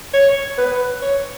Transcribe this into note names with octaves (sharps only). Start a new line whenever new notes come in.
C#5
B4
C#5